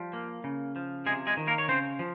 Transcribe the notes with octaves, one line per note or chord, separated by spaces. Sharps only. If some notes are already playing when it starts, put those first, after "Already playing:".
Already playing: F3 G3
A#3
C#3
F3
C3 G#3 G#4
G#3 G#4
D#3
A#3 A#4
C#5
C#3 C4 C5
F3